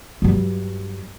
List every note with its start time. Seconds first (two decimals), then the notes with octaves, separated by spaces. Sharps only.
0.22 G2 F#3